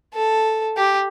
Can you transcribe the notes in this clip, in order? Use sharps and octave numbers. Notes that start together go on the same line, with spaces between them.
A4
G4